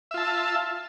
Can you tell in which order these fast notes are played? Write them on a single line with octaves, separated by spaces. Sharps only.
E5 F4 A5